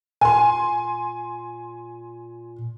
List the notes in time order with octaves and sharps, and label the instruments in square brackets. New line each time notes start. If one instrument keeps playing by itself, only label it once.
[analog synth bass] A#2 [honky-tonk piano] G#5 C6